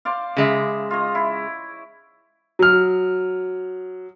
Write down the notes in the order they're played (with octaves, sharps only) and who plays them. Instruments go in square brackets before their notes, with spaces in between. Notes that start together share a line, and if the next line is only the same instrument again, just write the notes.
[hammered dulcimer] C5 D5 F5
[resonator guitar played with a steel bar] C#3 G#3 E5
[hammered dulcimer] F4 C#5 D#5
E4
[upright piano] F#3 F6